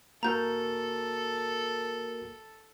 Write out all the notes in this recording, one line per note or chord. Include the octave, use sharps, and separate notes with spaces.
A#3 F#4 A4 A#4 A#5 G6